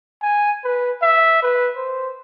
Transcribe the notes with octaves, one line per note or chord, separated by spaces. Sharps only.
G#5
B4
E5
B4
C5